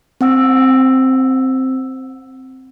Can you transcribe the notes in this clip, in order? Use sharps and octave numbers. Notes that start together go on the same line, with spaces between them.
C4 F#5 E6